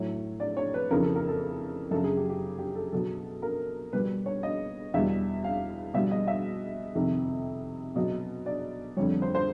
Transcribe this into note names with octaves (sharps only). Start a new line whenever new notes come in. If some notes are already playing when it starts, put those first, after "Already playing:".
Already playing: A2 F#3 C#5
D5
C#5
B4
F2 C#3 E3 A#4
A4
A#4
A4
F#2 C#3 F#3 A4
G#4
G4
G4
G4
A4
B2 F#3 A4
A#4
B2 G3 B4
C#5
D#5
E2 B2 G3 E5
F5
B2 G3 E5
D#5
E5
F2 C3 D#3
B2 F#3 D#5
D5
F2 D3 G3 C#5
C5
C5